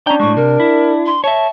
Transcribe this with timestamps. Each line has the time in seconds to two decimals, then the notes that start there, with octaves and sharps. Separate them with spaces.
0.07 C#4 D4 G5 A#5
0.20 A2 G#3 C#6
0.36 C3 A#4
0.60 E4
1.06 C6
1.24 C#5 E5 A5